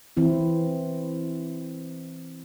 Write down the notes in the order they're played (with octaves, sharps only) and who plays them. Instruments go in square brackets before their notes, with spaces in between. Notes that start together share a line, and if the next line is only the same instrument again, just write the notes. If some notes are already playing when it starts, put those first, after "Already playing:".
[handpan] E3 C4 E4